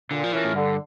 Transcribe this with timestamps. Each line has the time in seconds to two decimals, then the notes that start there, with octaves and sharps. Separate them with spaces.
0.11 A#2 D3
0.24 F3
0.33 E3 A3 C#4 F4 A#4
0.44 A2
0.54 G2 D3